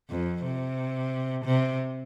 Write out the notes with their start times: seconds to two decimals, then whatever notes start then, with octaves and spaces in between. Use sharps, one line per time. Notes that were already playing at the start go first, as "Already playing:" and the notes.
0.10 F2
0.44 C3
1.45 C3